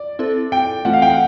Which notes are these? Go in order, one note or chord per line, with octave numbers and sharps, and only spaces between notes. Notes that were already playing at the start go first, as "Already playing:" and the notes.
Already playing: D5
C4 E4 A4
G5
E3 A3 C4 F4 F#5
F5
G5
F#5